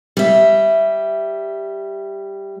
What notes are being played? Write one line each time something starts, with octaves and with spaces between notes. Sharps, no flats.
G3 E5